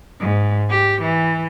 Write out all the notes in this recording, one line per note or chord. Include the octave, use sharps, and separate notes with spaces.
G#2
G4
E3